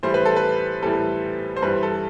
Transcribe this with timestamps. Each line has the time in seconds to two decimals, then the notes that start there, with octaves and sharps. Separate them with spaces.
0.03 A2 E3 G3 C5
0.14 B4
0.25 A4
0.36 B4
0.82 A2 E3 G3 A4
1.56 C5
1.62 G2 E3 G3 B4
1.83 A4